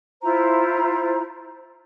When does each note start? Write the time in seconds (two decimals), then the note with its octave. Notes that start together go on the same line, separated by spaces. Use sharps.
0.22 E4 F4 C5 A#5